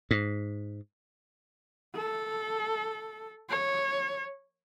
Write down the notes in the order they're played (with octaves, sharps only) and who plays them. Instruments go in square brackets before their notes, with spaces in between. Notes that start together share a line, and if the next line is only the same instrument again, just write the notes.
[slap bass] G#2
[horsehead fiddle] A4
C#5